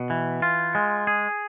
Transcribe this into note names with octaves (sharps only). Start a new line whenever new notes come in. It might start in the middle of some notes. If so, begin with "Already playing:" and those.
Already playing: B2
E3
F4
G#3
G#4